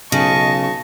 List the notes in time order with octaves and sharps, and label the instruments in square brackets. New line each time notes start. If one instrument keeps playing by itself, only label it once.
[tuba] B1 [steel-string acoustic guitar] C#3 [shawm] D#5 [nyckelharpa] A5 C#6